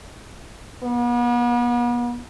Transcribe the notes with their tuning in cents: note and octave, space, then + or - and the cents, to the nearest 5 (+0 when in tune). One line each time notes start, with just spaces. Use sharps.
B3 -40